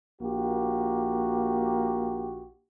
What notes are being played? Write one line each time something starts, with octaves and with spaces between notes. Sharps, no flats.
A#1 A#3 F#4 G4